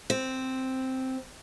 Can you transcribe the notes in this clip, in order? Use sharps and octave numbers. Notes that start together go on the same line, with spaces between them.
C4